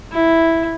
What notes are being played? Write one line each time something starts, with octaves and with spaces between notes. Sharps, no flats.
E4